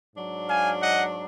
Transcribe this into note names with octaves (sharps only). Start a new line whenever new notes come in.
G#2 F#3 D4
F5 G#5
D#5 F#5